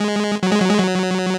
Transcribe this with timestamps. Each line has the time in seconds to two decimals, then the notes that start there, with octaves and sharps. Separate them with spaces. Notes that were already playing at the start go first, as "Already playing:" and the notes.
Already playing: G#3
0.43 F#3
0.52 G#3
0.61 F#3
0.70 G#3
0.80 F#3